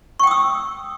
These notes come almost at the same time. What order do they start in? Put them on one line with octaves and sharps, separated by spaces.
C#6 G5 D#6 E6